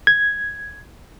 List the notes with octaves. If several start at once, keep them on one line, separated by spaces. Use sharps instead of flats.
G#6